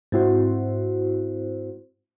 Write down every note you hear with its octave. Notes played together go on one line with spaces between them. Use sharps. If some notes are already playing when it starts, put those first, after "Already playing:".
G#2 C4 E4 F#4 C5